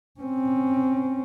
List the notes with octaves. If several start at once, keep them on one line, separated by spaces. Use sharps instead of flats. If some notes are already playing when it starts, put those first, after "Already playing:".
C4 C#4